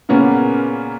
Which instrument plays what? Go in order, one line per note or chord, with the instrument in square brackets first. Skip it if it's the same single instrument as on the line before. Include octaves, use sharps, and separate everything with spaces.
[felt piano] A#2 C#3 A#3 B3 C#4